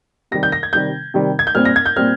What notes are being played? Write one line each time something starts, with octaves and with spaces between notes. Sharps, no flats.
C3 D#3 G3 A#6
G6
A#6
G#6
C3 D#3 G3 G6
C3 D#3 G3
G#6
G6
A#2 G3 C4 F6
A#6
G#6
G6
A#2 G3 C4 F6